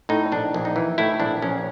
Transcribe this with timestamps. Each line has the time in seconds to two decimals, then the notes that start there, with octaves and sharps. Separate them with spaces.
0.09 A2 D#4
0.32 A#1 D4
0.54 A#1
0.65 D#4
0.76 E3
0.98 A2 E4
1.20 A#1 D4
1.42 A#1 C#4